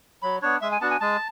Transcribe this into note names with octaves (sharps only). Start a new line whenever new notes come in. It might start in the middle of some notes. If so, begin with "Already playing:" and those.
F#3 B5
B3 D4 C#5
G#3 E5
G#5
B3 D4 F#4 A5
G#5
G#3 A5